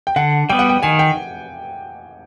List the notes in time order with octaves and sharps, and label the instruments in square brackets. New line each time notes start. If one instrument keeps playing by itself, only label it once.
[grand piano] G5
[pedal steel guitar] D3 [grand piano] F#5
[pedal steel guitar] G3 B3 [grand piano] G5
[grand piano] F#5
G5
[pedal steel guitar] D#3 [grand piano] G#5
[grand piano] G5